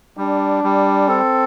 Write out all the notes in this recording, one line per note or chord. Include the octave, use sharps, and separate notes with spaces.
G3 D4
G3
C4 A4